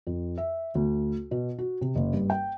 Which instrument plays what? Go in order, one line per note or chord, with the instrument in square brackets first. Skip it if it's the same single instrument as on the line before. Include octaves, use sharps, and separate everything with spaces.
[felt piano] F2
E5
D2
B2
F#4
C3
F#1
G2
G5